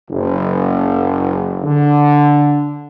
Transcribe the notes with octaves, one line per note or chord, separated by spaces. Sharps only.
F#1
D3